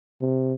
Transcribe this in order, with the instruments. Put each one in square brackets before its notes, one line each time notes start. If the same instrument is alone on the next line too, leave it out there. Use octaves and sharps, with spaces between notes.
[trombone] C3